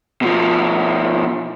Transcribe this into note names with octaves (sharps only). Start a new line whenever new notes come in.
B2 F3